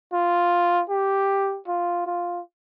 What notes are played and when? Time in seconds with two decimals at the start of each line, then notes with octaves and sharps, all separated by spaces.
0.13 F4
0.89 G4
1.67 F4
2.06 F4